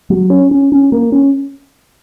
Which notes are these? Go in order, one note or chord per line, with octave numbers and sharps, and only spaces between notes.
F#3
C#4
C#4
C#4
A#3
C#4